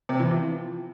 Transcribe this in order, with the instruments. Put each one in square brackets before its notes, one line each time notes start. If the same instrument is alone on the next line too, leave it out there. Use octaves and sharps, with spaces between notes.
[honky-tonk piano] C3
E3
F3